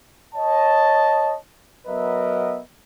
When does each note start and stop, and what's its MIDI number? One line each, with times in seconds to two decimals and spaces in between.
0.35 1.36 73
0.35 1.36 75
0.35 1.36 81
1.87 2.59 54
1.87 2.59 59
1.87 2.59 70
1.87 2.59 71
1.87 2.59 75
1.87 2.59 76